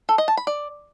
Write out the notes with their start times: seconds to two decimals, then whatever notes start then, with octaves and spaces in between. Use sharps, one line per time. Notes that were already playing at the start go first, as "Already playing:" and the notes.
0.09 A4
0.18 D#5
0.28 A5
0.37 B5
0.47 D5